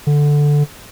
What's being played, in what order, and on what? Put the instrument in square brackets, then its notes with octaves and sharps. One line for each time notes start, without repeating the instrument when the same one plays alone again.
[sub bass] D3